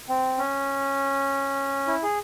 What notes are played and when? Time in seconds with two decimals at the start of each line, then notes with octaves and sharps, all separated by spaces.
0.09 C4
0.38 C#4
1.87 E4
2.03 G#4